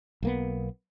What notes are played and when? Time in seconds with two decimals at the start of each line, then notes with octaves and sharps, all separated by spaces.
0.23 B1 A#3 B3